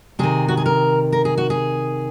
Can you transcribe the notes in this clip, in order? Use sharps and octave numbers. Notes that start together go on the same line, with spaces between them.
C3 D#3 G#4
F#4
G#4
A#4
A#4
G#4
F#4
G#4